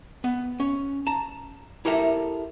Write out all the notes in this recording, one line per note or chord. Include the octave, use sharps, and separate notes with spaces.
B3
C#4
A5 A#5
E4 G4 A4 A#4 E5